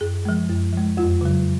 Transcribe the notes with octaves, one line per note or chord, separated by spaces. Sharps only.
F#2 G#4
F3 G#3
F#2
F3 G#3
F2 F4
C#3 F#3